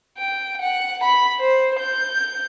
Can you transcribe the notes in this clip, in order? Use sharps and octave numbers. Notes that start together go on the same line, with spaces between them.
G5
F#5
B5
C5
G6